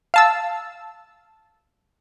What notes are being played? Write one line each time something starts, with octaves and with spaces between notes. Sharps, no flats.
F5 A5 E6